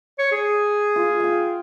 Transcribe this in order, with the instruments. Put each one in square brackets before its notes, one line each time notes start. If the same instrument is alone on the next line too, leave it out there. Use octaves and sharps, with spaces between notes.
[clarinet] C#5
G#4
[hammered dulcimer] F4
F5 G5